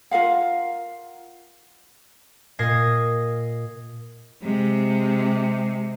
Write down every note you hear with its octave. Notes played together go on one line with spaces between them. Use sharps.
F4 A#4 F5 F#5
A#2 D#5 D#6 G#6 A#6 C7
C3 G#3